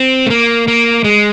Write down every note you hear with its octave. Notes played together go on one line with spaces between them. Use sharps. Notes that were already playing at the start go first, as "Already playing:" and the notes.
Already playing: C4
A3
A#3
A#3
G#3